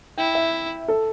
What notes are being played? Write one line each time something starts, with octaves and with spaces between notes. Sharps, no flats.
E4 G5
E5
A4